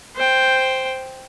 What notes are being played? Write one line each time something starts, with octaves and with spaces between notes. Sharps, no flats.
C5 G5